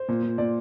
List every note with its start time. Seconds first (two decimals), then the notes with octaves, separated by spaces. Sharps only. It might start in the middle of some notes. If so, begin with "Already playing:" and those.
Already playing: C5
0.08 A#2
0.23 A#2
0.38 A#2 D5